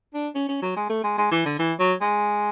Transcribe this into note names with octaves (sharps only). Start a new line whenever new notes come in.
D4
C#4
C#4
F#3
G#3
A3
G#3
G#3
E3
D3
E3
F#3
G#3